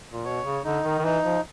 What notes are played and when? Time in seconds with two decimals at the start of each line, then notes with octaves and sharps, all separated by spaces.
0.12 A#2
0.25 B2 C#5
0.45 C#3
0.65 D3 D#4
0.84 D#3
0.98 D#3
1.04 E3 D#4
1.24 F3